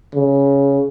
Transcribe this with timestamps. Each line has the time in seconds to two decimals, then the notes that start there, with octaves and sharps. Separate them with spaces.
0.15 C#3